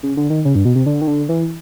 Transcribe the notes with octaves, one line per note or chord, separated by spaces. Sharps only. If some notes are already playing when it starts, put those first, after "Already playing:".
C#3
D3
D#3
C#3
G2
B2
C3
D3
D#3
D3
E3